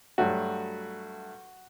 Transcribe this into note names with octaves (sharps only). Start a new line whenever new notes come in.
G2 F#3 A3 F#4